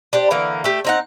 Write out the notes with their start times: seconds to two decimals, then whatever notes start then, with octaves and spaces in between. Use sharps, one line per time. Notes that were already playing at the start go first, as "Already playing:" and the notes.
0.13 D4 G4 C5
0.30 D3 E3 A#3 A#4
0.64 A3 G4
0.84 C4 D#4 F#5